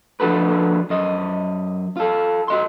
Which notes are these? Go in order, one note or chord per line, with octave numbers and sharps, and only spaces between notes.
F3 D4 F#4 A4 B4
F#2 D#5
F4 A4
F#4 D#5 C6